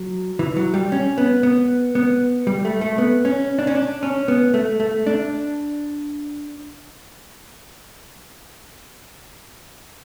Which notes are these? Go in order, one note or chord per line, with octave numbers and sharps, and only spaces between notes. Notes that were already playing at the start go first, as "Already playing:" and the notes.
Already playing: F#3
E3
F#3
G3
C#4
B3
B3
B3
G3
A3
A3
B3
C#4
D4
C#4
D4
C#4
B3
A3
A3
D4